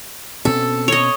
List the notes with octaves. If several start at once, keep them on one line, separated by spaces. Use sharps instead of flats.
B2 C4 C#4 A4
C#5 D#5